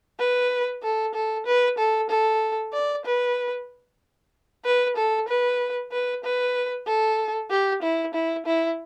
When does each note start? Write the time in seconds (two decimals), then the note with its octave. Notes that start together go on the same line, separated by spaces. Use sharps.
0.19 B4
0.83 A4
1.14 A4
1.46 B4
1.78 A4
2.10 A4
2.73 D5
3.05 B4
4.65 B4
4.96 A4
5.28 B4
5.92 B4
6.24 B4
6.87 A4
7.50 G4
7.82 E4
8.14 E4
8.46 E4